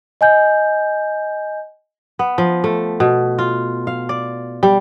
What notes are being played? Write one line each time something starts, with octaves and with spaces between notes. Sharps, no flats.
D#5 G#5 G6
B3
F3
A3
B2
F4
F5
D5
G3